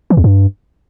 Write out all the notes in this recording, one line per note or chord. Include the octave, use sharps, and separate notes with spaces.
E3
E2
G2